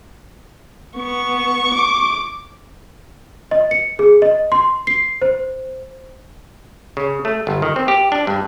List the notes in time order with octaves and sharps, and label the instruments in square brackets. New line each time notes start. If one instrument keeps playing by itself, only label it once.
[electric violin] B3 [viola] C#6
[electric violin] D6
[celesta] D#5
C#7
G#4
D#5
C6
C7
C5
[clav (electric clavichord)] C#3
A3
G1
D#3
C4
G4
D4
G2